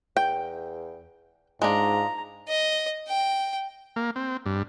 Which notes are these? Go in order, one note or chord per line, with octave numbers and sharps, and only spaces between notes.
E2 G5
G#2 G#3 D4 F4 A#5
D#5
G5
A#3
C4
G2